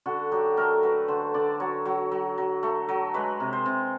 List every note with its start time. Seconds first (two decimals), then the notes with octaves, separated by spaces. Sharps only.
0.06 D3 F#4
0.32 F#3 G4
0.57 A3 A#4
0.83 F#3 B4
1.08 D3 C5
1.34 D3 D5
1.60 F#3 C#5
1.85 F#3
2.12 F#3
2.38 F#3
2.63 A3
2.89 F#3
3.14 G#3 B4
3.40 C3
3.53 C5
3.66 C3